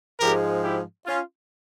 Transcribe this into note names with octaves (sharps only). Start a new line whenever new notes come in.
G#2 F3 G#3 G4 A#4
E4 G4
C#4 F4